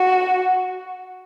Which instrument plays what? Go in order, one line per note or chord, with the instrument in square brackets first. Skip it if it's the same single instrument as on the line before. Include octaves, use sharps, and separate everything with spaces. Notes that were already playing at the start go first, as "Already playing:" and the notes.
Already playing: [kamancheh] F#4